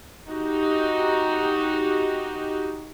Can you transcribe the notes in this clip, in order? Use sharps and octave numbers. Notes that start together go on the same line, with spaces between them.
D#4 F#4 G4